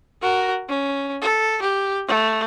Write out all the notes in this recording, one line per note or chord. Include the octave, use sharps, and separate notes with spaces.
F#4 A#4
C#4
A4
G4
A3